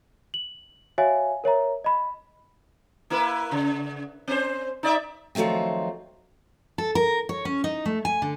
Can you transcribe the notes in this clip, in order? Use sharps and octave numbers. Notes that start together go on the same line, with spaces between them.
F#7
F#4 C#5 E5 F5 G#5
A#4 C#5 E5 A#5
D#5 B5
A#3 E4 B4
C#3
C4 C5
D#4 D5 E5
D#3 F3 F#3 A3 C4
A4
A#4
C#5
C#4
D#4
A3
G#5
D3